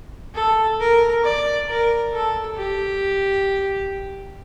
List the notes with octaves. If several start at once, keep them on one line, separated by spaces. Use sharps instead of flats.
A4
A#4
D5
A#4
A4
G4